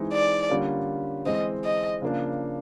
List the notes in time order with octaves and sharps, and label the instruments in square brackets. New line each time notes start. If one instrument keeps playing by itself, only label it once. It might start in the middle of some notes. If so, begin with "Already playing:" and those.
Already playing: [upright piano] E3 G#3 C4 D#4
[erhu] D5
[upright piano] D3 G3 A#3 C#4 F4
[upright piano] E3 G#3 C4 [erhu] D#5
[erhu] D#5
[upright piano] C#3 F3 A#3 D4